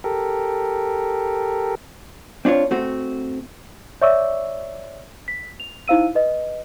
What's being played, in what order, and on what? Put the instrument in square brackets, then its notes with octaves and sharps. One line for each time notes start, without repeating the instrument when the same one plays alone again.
[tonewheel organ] G4 A4 A#4
[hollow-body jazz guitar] C4 D4 F4 C#5
A3 C4 F#4
[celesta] C#5 D5 E5 C#6 D6 E6
B6
F7
D#4 E4 C5 F5 E6 D#7
B4 D#5